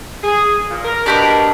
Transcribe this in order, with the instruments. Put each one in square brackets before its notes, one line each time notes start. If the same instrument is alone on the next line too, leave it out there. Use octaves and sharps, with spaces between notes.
[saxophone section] G#4
A#2
A#4
[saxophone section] B2 A#4 [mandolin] D4 G4 D6